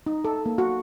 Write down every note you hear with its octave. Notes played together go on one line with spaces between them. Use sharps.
D#4
A4
A#3
F#4